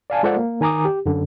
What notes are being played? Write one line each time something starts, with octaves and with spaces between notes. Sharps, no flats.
D5 F5 G#5 A5
G#3 F4 A4 C5 D5 F#5
A#3
D#3 G#5 A#5 D6 D#6
G4
F#2 D3